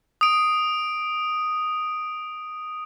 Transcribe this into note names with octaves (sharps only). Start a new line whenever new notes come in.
D#6 D7